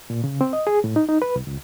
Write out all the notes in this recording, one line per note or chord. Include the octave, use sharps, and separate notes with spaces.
A#2
C#3
C4
D#5
G#4
A2
D#4
D#4
B4
C2
C#2